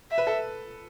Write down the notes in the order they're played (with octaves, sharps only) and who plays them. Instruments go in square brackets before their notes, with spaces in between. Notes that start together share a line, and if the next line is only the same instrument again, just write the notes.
[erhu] E5
[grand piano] B4
A4